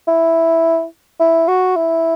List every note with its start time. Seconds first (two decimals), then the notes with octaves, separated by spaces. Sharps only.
0.07 E4
1.20 E4
1.48 F#4
1.76 E4